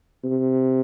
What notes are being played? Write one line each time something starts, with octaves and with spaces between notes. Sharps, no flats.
C3